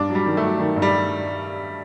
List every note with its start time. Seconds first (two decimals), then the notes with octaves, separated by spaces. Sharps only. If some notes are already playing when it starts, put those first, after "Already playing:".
Already playing: G2 D4
0.10 F#3
0.15 G3
0.26 D#3
0.37 A3
0.43 F#3
0.59 D#3
0.76 G2
0.82 G3